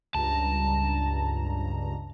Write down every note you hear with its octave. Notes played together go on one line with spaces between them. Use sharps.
C#2 G2 A5 A#5